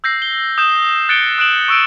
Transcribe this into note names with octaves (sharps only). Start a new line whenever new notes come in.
E6 G6 A#6 C7
G7
D#6 G6 E7
F#6 A6 C#7 D7 G7
D#6 F#6 D7 E7 F#7
C#6 E6 D7